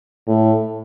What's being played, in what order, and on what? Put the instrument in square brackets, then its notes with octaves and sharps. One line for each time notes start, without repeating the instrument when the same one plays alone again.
[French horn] A2